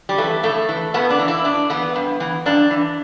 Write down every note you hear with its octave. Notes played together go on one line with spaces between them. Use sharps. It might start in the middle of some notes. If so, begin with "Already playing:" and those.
G3
E3 A3
A2 A3
E3
A2 B3
D4
E3
E4
A2 D4
E3 B3
G2
E3
G2 D4
E3